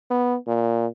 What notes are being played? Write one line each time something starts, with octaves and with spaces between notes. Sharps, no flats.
B3
A#2